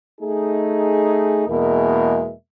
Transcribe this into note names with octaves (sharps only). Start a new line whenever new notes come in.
A3 D#4 G#4
E2 B2 G#3 A#3 A#4 E5